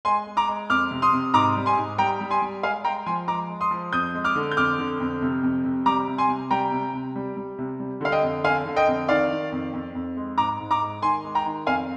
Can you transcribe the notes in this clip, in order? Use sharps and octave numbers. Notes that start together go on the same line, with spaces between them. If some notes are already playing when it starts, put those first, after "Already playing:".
G#3 G#5 C6
G#3
A#5 D6
G#3
F2 D6 F6
C3
C6 D#6
C3
G#2 A#5 D6
G3
G#5 C6
G#2
G3 G5 A#5
G3
G#5 C6
G3
G#3 F5 G#5
G#3 G5 A#5
F3 G#5 C6
G#3 A#5 D6
G#3
C6 D#6
F3
F2 D#6 G6
G#3
D6 F6
D3
G6
F2 D6 F6
D3
F2
C3
F2
C3
G3 A#5 D6
C3
G#5 C6
C3
G3 G5 A#5
C3
C3
G3
G3
C3
G3
D3 F5
D#5 G5
F2
D3 F5 G#5
D3
D#5 G5
F2
D#3 D5 F5
D#3
F2
F2
F2
G#3
G#2 A#5 D6
G#2
A#5 D6
G#3
D#3 G#5 C6
G#3
G5 A#5
D#3
F2 F5 G#5